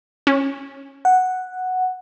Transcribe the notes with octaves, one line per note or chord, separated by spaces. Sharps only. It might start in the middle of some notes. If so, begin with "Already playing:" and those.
C#4
F#5